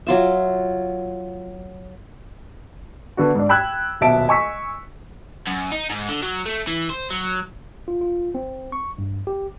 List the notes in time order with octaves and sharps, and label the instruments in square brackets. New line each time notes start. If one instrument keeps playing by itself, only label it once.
[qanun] F#3 F4 E5
[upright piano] D3 B3 D4 F#4
G#2 D4
G5 B5 E6 F#6 G#6
D#1 B1 B2 E5 A5 D7
D#5 G#5 C#6 E6 B6
[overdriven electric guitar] F#2
D#4
G#2
D3
F#3
A3
E3
C5
F#3
[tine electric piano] F4
F4
C4
C#6
G2
G4